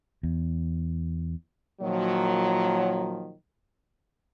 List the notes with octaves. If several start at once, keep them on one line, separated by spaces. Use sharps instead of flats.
E2
A#2 D#3 F3 F#3